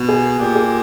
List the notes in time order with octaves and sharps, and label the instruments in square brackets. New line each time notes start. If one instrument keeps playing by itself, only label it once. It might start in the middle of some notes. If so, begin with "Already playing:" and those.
Already playing: [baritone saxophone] B2
[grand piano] G#4
[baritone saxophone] A#2 [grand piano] G4
[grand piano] G#4